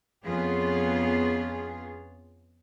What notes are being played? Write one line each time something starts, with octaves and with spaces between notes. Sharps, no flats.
F2 B3 C#4 F4 G#4